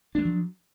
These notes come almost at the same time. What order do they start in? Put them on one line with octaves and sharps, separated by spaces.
D4 G#3 F#3 F3